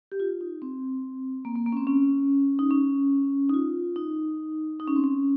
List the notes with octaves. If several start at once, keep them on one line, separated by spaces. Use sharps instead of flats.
G4
F4
D#4
C4
A#3
A#3
A#3
C#4
C4
C#4
D#4
C#4
D#4
F4
D#4
D#4
C#4
C4
C#4